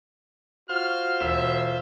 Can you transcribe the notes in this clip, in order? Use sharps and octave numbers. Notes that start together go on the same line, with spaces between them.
F4 F#4 C5 F6
E1 E5 E7